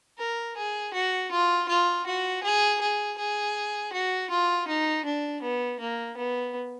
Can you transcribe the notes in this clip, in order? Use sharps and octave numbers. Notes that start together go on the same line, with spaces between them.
A#4
G#4
F#4
F4
F4
F#4
G#4
G#4
G#4
F#4
F4
D#4
D4
B3
A#3
B3